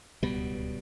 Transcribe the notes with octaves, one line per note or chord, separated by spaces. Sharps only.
D1 C#2 B2 G3 B3